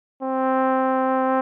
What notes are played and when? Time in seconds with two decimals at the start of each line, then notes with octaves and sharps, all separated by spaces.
0.22 C4